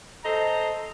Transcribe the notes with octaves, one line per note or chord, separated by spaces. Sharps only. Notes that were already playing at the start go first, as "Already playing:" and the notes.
A4 C5 D#5 A#5